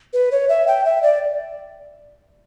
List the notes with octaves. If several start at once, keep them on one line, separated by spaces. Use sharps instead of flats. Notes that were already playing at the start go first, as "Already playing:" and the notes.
B4
C#5
E5
G5
E5
D5